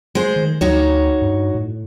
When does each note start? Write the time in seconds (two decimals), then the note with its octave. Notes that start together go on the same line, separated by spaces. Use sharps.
0.15 G#3 C5
0.36 D#3
0.61 D2 D#4 F#4 C#5
1.22 G2
1.55 A2